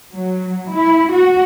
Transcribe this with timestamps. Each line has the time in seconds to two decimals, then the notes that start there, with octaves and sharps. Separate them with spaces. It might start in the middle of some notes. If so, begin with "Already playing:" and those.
0.11 F#3
0.70 E4
1.12 F#4